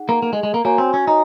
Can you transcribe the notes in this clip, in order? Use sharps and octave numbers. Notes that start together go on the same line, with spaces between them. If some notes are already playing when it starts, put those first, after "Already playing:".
Already playing: D#4 G#4 F#5
A#3
A#3
G#3
G#3
A#3
A#3 F#4 C#5 G#5
C4
C#4
D#4